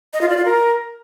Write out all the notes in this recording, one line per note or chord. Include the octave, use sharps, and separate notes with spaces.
D#5
F4
D5
F4
A#4